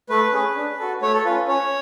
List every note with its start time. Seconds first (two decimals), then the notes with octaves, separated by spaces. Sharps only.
0.09 A3 B4
0.33 C#4 G#4
0.56 D4
0.79 F#4 A4
1.02 A3 C#5
1.13 A4
1.25 C#4 F4 B4
1.48 C#4 C#5